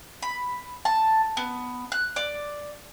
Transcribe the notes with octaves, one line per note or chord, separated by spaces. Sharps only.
B5
A5
B3
F#6
D5